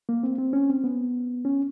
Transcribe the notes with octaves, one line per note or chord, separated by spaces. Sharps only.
A#3
C4
C4
C#4
C4
B3
C#4